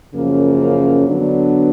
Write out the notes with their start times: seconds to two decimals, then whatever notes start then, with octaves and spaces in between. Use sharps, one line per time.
0.14 F#2 C#3 F3 A#3
1.07 D3 F#3 B3 D4